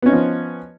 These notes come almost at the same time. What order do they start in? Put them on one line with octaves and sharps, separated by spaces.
B3 C#4 D#4 F3